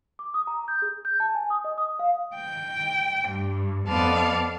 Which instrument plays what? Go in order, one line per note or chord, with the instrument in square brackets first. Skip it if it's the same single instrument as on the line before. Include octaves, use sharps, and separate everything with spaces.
[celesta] D6
D#6
A#5
G6
G#4
G6
A5
G#5
D#6
D#5
D#6
F5
[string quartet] G5
G2
F2 B3 D5 F5 A5